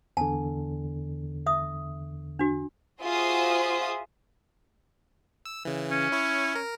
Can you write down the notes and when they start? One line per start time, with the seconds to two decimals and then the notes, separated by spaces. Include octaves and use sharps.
0.17 E2 D3 G#5 A5
1.46 E5 D#6
2.39 D4 F#4
3.01 F4 F#4 G#4 C5 E5 D#6
5.45 E6
5.65 C#3 E3
5.91 C#4
6.12 E4 C#5
6.55 A#4